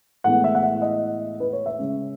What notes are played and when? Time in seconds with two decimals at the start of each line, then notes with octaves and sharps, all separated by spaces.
0.24 A2 E3 G#3 B3 F#5
0.44 E5
0.55 F#5
0.63 E5
0.82 D#5
1.40 B4
1.53 C#5
1.66 E5
1.78 C#3 G#3 C#4